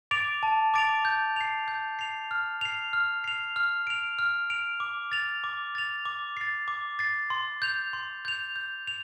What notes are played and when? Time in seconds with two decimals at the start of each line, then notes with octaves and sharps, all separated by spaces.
0.11 D6 A6 D7 F7
0.43 A5
0.74 D6 A6 D7 F7
1.05 G6
1.36 C7 F7
1.68 G6
1.99 C7 F7
2.31 F6
2.61 C7 F7
2.93 F6
3.24 C7 F7
3.56 F6
3.87 D7 F7
4.19 F6
4.50 D7 F7
4.80 D6
5.12 A6 F7
5.44 D6
5.75 A6 F7
6.05 D6
6.37 A6 C7
6.68 D6
6.99 A6 C7
7.30 C6
7.62 G6 F7
7.93 C6
8.25 G6 F7
8.56 G6
8.87 F7